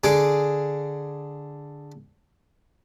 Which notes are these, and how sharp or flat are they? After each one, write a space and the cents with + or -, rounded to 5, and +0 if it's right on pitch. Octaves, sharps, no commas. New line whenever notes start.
D3 +0 G#4 +0 D6 +0